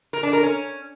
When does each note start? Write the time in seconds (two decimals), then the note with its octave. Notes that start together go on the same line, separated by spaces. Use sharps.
0.13 A#4
0.23 D4
0.33 A#4
0.43 C#4